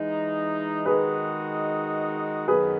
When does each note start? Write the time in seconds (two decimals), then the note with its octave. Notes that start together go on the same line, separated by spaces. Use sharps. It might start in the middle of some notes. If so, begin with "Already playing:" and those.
Already playing: E3 G#3 D#4
0.86 D#3 G#3 D#4 F#4 G#4 B4
2.48 F#2 D#3 F#3 B3 G#4 B4